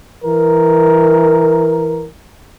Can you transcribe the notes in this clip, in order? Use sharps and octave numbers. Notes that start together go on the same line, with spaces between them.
E3 A#4